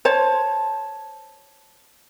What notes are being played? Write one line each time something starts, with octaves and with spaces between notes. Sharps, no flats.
C5 C#5 A5